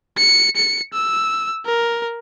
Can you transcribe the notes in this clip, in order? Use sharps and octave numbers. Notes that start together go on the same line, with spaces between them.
C#7
C#7
E6
A#4